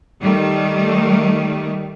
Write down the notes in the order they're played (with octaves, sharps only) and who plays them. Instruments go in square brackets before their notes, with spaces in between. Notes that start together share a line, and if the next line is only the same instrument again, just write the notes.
[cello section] D#3 G3 A3